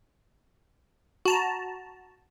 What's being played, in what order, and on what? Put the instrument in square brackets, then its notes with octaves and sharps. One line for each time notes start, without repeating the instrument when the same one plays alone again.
[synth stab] F#4 A5 A#5